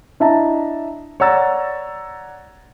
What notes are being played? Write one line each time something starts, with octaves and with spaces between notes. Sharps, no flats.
D4 E4 D#5 E5 A5 A#5
C#5 D5 F#5 A#5 E6 A6